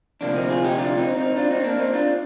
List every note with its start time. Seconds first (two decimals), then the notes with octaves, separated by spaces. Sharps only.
0.21 D2 C3 F3 A#3 D4
0.35 C4 D#4
0.50 F4 G#4
0.64 D#4 G4
0.78 D4 F4
0.98 C4 D#4
1.17 C4 D#4
1.36 D4 F4
1.50 C4 D#4
1.64 A#3 D4
1.79 C4 D#4
1.93 D4 F4